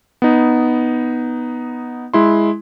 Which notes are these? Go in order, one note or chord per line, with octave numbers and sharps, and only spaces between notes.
B3 D#4
G#3 E4 C6